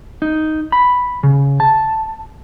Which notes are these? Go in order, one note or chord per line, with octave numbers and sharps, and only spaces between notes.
D#4
B5
C#3
A5